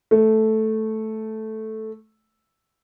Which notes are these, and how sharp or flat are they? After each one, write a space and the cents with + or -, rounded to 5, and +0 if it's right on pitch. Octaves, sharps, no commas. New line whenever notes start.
A3 -5